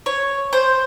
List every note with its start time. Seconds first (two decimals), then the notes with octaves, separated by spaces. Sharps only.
0.06 C#5
0.53 C5